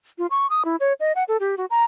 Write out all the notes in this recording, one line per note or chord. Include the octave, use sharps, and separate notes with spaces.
F4
C#6
D#6
E4
C#5
D#5
F#5
A4
G4
F#4
A#5